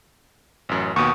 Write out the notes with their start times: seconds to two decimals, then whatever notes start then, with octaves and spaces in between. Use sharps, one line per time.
0.69 A1 F#2
0.96 D#2 B2 C#6 D#6